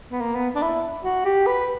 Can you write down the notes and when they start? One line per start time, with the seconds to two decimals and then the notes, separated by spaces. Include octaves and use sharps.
0.12 B3
0.21 A#3
0.35 B3
0.55 D4
0.62 E4
1.04 F#4
1.25 G4
1.47 B4